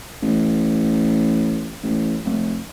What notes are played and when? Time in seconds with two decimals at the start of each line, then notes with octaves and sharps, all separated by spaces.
0.22 A1
1.83 A1
2.25 F1